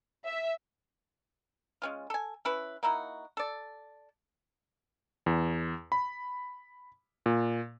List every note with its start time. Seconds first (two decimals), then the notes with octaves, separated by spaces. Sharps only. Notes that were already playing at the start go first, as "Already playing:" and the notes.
0.25 E5
1.82 G#3 C#4 F4
2.10 A4 G#5
2.45 C#4 E4 B4
2.83 A#3 D#4 E4 F#4
3.37 A4 D5
5.26 E2
5.92 B5
7.26 A#2